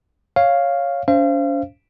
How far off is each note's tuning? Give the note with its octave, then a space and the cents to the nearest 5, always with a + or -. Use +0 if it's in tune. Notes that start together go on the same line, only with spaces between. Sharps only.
C#5 +0 F5 +0
C#4 +45 C5 +0 F5 -35